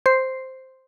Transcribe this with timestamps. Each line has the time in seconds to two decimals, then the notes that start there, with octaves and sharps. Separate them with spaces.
0.06 C5 C7